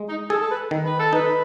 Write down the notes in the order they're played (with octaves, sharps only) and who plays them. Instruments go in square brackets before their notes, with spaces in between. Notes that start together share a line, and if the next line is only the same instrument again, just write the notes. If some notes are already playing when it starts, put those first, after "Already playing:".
Already playing: [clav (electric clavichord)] G#3
[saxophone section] D#4
[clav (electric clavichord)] G#4 [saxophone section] A4
[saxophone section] A4
B4
[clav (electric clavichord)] D#3
[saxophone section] B4
A4
[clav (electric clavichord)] D#4 [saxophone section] B4